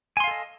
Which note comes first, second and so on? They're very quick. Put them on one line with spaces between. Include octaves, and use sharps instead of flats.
G#5 C6 F5 A4 D#5